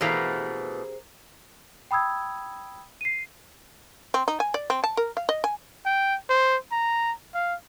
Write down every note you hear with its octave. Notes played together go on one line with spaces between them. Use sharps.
B2 E3 A3 G4 G#4 A#4 C5 F5
G5 B5 D#6 E6 G#6
C7 D#7
C4
D#4
G#5
D5
C4
A5
A#4
F5
D#5
G#5
G5
C5
A#5
F5